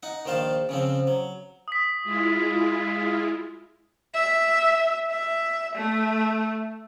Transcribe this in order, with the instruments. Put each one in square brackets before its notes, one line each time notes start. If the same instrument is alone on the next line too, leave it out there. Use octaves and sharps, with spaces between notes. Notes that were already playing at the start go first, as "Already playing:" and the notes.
[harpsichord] D#4 F#5
A#1 D#3 C5 F5 A5
C#3 F3 C4
F#3
[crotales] D#6 B6
[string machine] G#3 E4 F4
[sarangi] E5
E5
A3